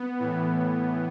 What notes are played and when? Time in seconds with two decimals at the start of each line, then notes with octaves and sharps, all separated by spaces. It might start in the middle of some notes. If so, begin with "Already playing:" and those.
Already playing: B3
0.19 A2 E3